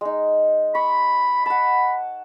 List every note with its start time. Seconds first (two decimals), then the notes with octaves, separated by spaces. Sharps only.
0.01 G#3 D#4
0.75 B5 C#6
1.46 F#5 A5 B5